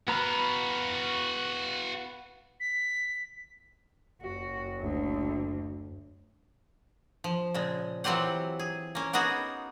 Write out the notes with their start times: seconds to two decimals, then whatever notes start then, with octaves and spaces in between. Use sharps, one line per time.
0.08 B3 F#4 F5 A#5 B5
2.60 B6
4.22 F#1 F#4
4.81 D2
7.24 F3
7.54 A#2 C#3 G#3
8.04 E3 F#3 C4 F4 G4 F#5
8.59 G#4
8.95 A#3 C#4
9.13 A#3 B3 D#4 F#4 G#4